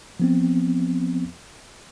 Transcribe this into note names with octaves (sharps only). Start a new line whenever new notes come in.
F3 B3 C4